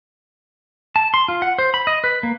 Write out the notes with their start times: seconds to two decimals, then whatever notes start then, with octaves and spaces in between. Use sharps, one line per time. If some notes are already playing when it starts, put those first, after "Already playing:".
0.96 A5
1.14 C6
1.28 F4
1.42 F#5
1.58 C5
1.74 B5
1.87 D#5
2.04 B4
2.23 A#3